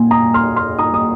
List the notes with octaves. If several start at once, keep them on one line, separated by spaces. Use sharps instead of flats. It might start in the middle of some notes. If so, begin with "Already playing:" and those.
Already playing: A#2 G#5 C6
A#5 D#6
C6 F6
C6 F6
A#5 D#6
D#6